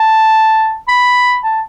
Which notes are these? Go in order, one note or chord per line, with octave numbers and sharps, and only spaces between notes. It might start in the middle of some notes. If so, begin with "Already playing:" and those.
Already playing: A5
B5
A5